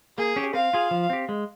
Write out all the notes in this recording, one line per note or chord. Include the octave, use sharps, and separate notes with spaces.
A#3 G#4
C#4 G4
C4 F5
F4 G#4
F3
C4 G4
G#3